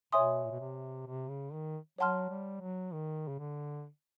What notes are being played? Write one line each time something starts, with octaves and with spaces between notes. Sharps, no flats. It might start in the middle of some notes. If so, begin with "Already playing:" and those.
B2 C#5 E5 G#5 C6 D#6
A#2
B2
C3
C3
C#3
D#3
F#3 C#5 F#5 A5 C6 F6
G3
F#3
D#3
C#3
D3